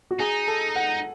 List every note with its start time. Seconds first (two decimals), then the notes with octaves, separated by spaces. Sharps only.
0.11 F#4
0.20 D#4 G#4
0.48 A4
0.76 F#5